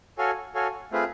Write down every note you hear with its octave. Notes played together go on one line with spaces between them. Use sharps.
F#4 A4 C#5 F5 G#5
F#4 A4 C#5 F5 G#5
A3 C4 F4 G#4 B4